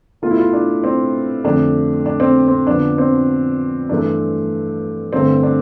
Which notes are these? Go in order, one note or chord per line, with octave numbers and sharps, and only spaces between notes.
B2 A3 F4
E4
F4
D4
C4
F2 D3 A3 D4
D4
C4
C4
F2 D3 F3 B3 D4
C4
G2 E3 A3 D4
G2 D3 A3 C4
D4